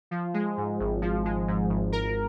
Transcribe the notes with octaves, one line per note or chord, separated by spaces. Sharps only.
F3
G#3
G#2
G#1
F3
G#3
G#2
G#1
A#4